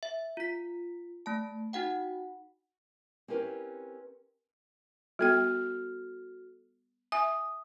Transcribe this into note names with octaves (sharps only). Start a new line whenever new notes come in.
E5
F4 B6
A3 A5
D#4 F#4 F#5 G5
C4 C#4 E4 G4 A#4 B4
G3 B3 F#4 A4 G5 F6
E5 G#5 D#6